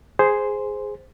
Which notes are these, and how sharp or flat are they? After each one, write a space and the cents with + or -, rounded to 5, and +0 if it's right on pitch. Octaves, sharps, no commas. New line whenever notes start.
G#4 +0 C5 -5